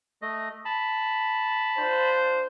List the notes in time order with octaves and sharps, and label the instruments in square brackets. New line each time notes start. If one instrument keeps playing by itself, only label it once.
[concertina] A3 D#5
A5 B5
[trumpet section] D4 F4 C5